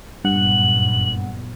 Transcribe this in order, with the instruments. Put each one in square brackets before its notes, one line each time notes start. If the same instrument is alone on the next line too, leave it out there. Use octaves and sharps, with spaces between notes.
[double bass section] F#1 A#2 B3 [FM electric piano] G2 F#5 [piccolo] F#7